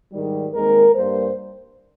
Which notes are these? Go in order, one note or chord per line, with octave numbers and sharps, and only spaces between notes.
G#2 D#3 G3
D#2 D#3 G#3 C4 A#4
G2 G3 A#3 C5